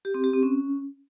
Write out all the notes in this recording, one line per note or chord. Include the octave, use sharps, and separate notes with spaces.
G4
C4
G4
C4
C#4